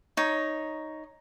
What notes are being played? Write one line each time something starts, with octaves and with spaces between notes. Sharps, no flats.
D#4 C#5